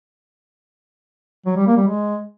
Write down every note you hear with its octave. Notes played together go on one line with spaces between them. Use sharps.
F#3
G3
A#3
G3
G#3